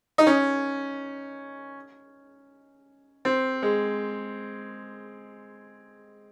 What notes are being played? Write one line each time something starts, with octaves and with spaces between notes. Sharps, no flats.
D#4
C#4
C4
G#3